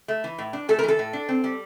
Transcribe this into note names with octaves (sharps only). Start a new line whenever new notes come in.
A3
E3
A2
D4
A3 A4
A#4
E3
A4
A2
D4
C4
G3